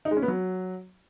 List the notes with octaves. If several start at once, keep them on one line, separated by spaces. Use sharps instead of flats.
D#4
G#3
C#4
B3
F#3